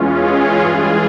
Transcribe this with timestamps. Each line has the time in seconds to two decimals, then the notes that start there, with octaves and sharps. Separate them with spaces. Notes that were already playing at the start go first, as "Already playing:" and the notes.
Already playing: E2 E3 G#3 C#4 F4
0.22 F4 G#4
0.62 G2 E3 G#3 F4 G#4